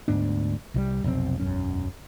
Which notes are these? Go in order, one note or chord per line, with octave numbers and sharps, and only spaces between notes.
D2 G#2 B3 D4
C2 E3 G3
F1 B1 A#2 C4
E1 B1 F#2 C#4